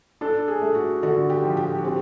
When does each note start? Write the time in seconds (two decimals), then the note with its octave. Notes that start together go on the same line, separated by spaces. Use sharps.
0.21 D4 A4
0.48 G#4
0.62 A3
0.75 F#4
1.03 D3 F#4
1.30 G4
1.43 F3
1.57 G4
1.78 F#4
1.84 C4 G4